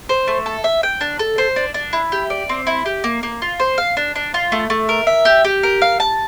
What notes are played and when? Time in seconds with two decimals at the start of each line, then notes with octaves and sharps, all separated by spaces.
0.09 C5
0.28 A3
0.46 A4
0.64 E5
0.83 G5
1.01 D4
1.19 A4
1.38 C5
1.56 D4
1.74 D4
1.93 E4
2.12 G4
2.30 D5
2.49 C4
2.67 E4
2.86 G4
3.04 A#3
3.23 A#3
3.42 F4
3.60 C5
3.78 F5
3.97 D4
4.15 D4
4.34 F4
4.52 A3
4.70 A3
4.89 A#4
5.07 E5
5.25 G4
5.45 G4
5.63 A#4
5.82 F5
6.00 A5